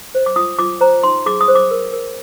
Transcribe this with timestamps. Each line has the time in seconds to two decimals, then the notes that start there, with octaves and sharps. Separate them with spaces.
0.15 C5
0.26 D6
0.36 F4 D#6
0.59 F4 D6
0.81 C5 A#5
1.04 D#4 C6
1.26 G#4 D6
1.41 D#6
1.48 C5
1.55 D6
1.71 A#4
1.93 A#4